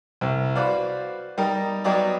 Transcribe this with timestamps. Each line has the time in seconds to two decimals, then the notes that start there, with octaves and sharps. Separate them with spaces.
0.21 C2
0.55 F#4 B4 C5 D5 F5
1.38 G3 D#4 G4 A#4 D#5
1.84 F#3 G3 B3 G4 D5 D#5